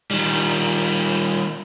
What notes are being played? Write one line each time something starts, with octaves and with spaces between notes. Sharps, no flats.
D#3 G3